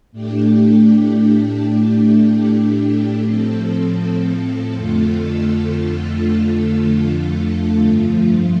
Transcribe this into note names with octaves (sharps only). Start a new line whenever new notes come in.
A2 A3 D4 G4
A2 A3 D4 G4
A2 F3 C4 A4
F2 D3 A3 F4 A4
F2 D3 A3 F4 A4
G2 F3 A3 F4